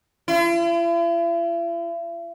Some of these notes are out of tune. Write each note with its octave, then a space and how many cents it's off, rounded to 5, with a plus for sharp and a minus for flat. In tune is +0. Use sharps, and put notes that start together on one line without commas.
E4 +45